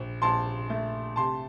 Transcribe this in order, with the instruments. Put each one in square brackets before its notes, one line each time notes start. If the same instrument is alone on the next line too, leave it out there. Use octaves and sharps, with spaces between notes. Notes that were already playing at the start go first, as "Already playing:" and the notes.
Already playing: [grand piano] A#1
A#1 A5 C6
A3
C3 A5 C6